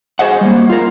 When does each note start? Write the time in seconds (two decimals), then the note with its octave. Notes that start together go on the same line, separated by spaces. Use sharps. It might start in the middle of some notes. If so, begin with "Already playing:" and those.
0.19 F#4 G#4 C5 D#5 F#5
0.41 G3 A#3
0.69 F4 A#4